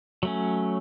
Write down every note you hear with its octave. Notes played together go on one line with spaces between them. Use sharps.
F#3 A3 C#4